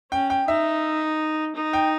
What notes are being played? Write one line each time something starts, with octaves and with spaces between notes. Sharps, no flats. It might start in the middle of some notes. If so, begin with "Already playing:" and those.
C#4 G5
G5
D#4 E5
D#4
G5